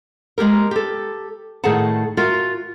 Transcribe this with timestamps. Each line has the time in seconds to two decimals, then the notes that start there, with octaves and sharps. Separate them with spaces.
0.38 G#3 A#3 G4 A#4
0.71 G4 A4
1.64 A2 D#3 G#4 A4 F#5 A5
2.17 F4 F#4 A#4 E5